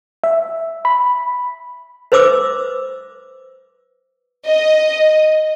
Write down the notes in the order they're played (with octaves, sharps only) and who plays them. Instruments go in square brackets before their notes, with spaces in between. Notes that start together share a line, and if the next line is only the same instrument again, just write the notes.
[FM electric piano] E5
B5
[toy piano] B4 C5 E5 D6 E6
[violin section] D#5